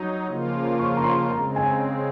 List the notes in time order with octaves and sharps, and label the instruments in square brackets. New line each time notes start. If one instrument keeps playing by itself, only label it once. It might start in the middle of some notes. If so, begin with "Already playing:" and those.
Already playing: [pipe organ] F#3 D#4
C#3 F3 A#3 F4
[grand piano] C#6
A#5
C6
[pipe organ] C#3 G#3 C4 [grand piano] A#5
[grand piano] G#5